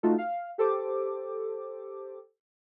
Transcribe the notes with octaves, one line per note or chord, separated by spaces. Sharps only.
A3 D#4 F4 F#4 A4
F5
G4 A4 C5 D6